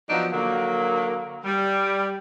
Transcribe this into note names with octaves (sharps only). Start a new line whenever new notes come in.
F3 F#3 B3 D4 D#4
D3 F#3 A#3
G3